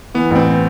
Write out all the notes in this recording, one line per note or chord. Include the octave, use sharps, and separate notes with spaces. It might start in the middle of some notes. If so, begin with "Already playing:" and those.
E3 B3
A1 C4